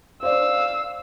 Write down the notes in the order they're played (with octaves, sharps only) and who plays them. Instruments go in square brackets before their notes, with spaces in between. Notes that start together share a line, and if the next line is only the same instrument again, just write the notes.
[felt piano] C5 D5 [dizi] F5 [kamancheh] E6